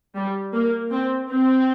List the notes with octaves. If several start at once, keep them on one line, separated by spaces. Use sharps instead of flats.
G3
A#3
C4
C4